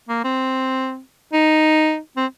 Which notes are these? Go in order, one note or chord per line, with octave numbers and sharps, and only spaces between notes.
A#3
C4
D#4
C4